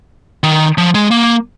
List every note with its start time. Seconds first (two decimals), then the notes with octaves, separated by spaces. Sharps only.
0.43 D#3
0.78 F3
0.95 G#3
1.11 A#3